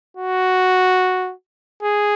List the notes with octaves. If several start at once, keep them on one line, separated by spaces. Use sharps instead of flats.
F#4
G#4